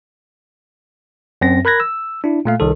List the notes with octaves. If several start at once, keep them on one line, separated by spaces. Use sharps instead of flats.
F#2 C4 A#6
A#4 B5 F#6 G#6 A#6
E6
D4 E4
A#2 A3 F5
C2 D#3 A4